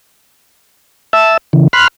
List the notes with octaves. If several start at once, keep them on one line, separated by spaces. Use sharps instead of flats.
E5 A5 E6
C#3 E3
B5 C6 F6 F#6